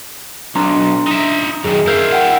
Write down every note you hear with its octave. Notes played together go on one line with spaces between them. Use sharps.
B1 D4 A#5 C6
D#4 E5
F#2 D#3 G#4
E4 A#4 F5 F6 G6
F#5 G5